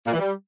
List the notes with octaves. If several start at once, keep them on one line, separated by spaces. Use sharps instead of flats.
A#2
E3
G3